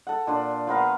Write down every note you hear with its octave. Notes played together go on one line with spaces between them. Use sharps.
A4 F#5
A#2 D4 C6
F3 B3 A#4 F5